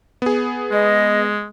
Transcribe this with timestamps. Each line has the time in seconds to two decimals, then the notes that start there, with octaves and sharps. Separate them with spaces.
0.22 B3 G#4
0.71 G#3 D#5